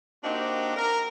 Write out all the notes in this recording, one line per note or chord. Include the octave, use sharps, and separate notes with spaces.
A#3 C4 D4 D#4 F#4 G4
A#4